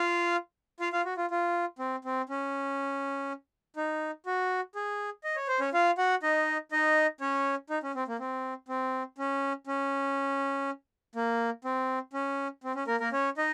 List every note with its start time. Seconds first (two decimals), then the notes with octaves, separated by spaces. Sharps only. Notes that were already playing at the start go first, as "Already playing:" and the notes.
Already playing: F4 F5
0.80 F4 F5
0.93 F4 F5
1.05 F#4
1.17 F4
1.31 F4
1.79 C4
2.05 C4
2.29 C#4
3.77 D#4
4.26 F#4
4.75 G#4
5.24 D#5
5.36 C#5
5.48 C5
5.60 C#4 C#5
5.73 F4 F5
5.98 F#4 F#5
6.23 D#4 D#5
6.72 D#4 D#5
7.21 C#4 C#5
7.70 D#4
7.83 C#4
7.95 C4
8.08 A#3
8.19 C4
8.68 C4
9.18 C#4
9.67 C#4
11.15 A#3
11.64 C4
12.13 C#4
12.64 C4
12.75 C#4
12.87 A#3 A#4
13.00 A#3 A#4
13.12 C#4 C#5
13.38 D#4 D#5